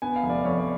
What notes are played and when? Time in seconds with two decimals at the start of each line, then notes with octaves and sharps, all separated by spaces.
0.02 B3 G#5
0.16 F5
0.23 F1
0.30 D5
0.45 F2 C#5
0.58 D5